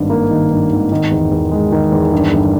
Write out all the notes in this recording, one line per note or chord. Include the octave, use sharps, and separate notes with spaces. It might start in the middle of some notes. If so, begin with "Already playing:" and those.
Already playing: G#1 G2
A#3
D#3
G2
G#1
D#3
E2
E2
G#3
D#3
E2
G2
G1